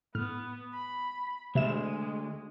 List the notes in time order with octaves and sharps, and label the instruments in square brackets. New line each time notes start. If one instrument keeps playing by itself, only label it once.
[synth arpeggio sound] A2 F6 [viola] B3
[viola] B5
[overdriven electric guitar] D2 [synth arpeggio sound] C3 E5 E7 [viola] G#3